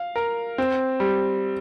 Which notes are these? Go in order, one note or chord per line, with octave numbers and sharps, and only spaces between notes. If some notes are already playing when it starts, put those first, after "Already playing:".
Already playing: F5
A#4
C4
G3